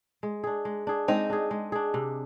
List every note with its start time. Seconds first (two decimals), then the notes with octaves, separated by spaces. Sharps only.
0.23 G#3
0.44 D4 G#4
0.65 G#3
0.87 D4 G#4
1.08 G#3 C4 D#4
1.30 D4 G#4
1.51 G#3
1.72 D4 G#4
1.94 C3